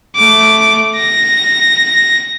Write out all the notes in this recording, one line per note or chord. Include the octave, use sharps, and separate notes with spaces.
A3 D6
A#6